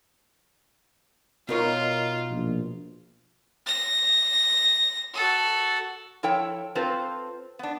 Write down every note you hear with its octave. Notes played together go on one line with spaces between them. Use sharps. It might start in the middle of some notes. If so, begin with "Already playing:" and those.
B2 D#4 F4 A#4 C#5
A#1
A#6
F#4 A4
F3 E4 A4 C#5 G5
C4 F4 A4 B4 C5
B3 D4